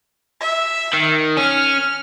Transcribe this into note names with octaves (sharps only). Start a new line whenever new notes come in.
E5
D#3
C#4 F6